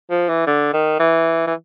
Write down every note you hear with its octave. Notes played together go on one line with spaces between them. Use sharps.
F3
E3
D3
D#3
E3
E3